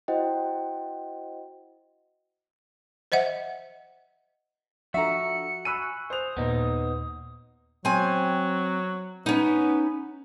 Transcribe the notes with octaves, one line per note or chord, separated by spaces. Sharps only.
E4 F#4 C5 D#5 F#5 G5
C5 D#5 E5 F#5
F3 D4 F#4 A4 E5 A#5 C#7
G#5 B5 C#6 E6 F#6 D#7
C5 D#6 F7
D#2 A#2 B3 D#4
F#3 C4 G#5
B3 C#4 D#4